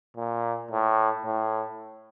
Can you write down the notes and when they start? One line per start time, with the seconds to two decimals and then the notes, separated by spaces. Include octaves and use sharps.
0.16 A#2
0.71 A2
1.26 A2